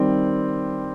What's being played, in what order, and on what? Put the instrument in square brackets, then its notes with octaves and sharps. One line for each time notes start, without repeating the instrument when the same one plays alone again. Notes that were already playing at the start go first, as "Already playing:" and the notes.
Already playing: [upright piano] D#3 G3 C4